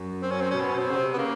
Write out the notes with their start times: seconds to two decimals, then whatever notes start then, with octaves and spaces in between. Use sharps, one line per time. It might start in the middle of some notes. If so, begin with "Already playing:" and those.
Already playing: F#2
0.22 C4
0.31 C#4
0.41 C4
0.51 B2 C#4
0.60 C4
0.69 C#4
0.76 B2 C4
0.91 C#3
0.97 C3
1.13 B3
1.18 C#3 A#3